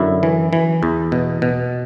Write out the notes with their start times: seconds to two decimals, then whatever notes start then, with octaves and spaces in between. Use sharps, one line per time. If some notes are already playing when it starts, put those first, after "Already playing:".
Already playing: F#2 D3 E4
0.23 E3
0.53 E3
0.83 E2
1.12 B2
1.42 B2